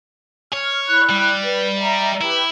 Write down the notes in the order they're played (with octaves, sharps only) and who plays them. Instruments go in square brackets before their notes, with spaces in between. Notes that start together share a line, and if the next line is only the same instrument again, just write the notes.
[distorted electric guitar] C#5 [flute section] F6
[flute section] E4 B5 F#6
[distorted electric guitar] G3
[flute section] B4
D#5 E5 A#5
[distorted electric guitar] E4 [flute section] G4 B4